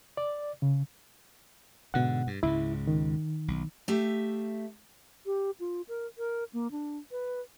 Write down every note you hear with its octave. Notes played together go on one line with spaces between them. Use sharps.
D5
C#3
G#2 B2 D3 F#5
G2
C#2 G#2 C#3 E4
D#3
B1
A3 G4 E5 F5
G4
F4
A#4
A#4
A#3
D4
B4